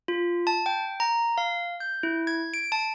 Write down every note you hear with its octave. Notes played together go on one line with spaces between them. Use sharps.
F4
A5
G5
A#5
F5
G6
E4
G#6
D7
A5